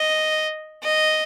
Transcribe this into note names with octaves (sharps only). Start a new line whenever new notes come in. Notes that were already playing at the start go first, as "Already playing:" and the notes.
Already playing: D#5
D#5